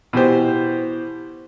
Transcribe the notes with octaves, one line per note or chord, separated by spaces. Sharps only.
B2 E3 G4 C5